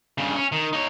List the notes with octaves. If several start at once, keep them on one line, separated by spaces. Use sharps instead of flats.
G2 C#3
C#4
D#3
D#4 C#5